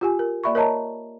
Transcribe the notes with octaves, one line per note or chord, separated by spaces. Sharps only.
F4 G4 G#5
A#4
A#3 D5 E5 B5 C#6
A#4 C#5 D#5 A5 A#5